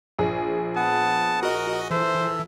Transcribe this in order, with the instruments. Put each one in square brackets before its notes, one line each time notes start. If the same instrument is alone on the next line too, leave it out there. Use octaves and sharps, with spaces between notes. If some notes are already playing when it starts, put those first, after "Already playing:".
[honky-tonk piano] A#1 G#4
[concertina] B3 F#5 D#6 [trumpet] A5
[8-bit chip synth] F#4 D#5 [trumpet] A#4
[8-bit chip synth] E3 [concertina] A4 E5 [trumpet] C5